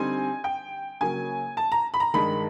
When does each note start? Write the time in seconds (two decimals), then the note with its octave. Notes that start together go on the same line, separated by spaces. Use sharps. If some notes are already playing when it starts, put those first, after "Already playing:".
Already playing: D3 G3 C4 D#4 G#5
0.44 G5
1.01 C#3 F#3 A#3 C#4 G#5
1.57 A5
1.72 A#5
1.94 B5
2.00 A#5
2.14 G2 D#3 G#3 B5